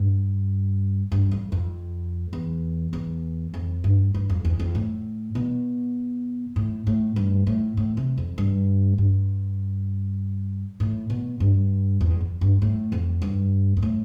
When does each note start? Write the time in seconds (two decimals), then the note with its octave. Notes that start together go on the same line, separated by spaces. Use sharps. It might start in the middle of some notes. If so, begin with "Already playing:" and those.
Already playing: G2
1.12 G2
1.31 F2
1.52 F2
2.33 E2
2.93 E2
3.54 F2
3.84 G2
4.14 G2
4.29 F2
4.45 E2
4.59 F2
4.75 A2
5.35 B2
6.56 A2
6.87 A2
7.16 G2
7.47 A2
7.77 A2
7.97 C3
8.18 F2
8.38 G2
8.98 G2
10.80 A2
11.10 B2
11.40 G2
12.01 E2
12.21 F2
12.41 G2
12.62 A2
12.92 F2
13.22 G2
13.77 G2
13.82 A2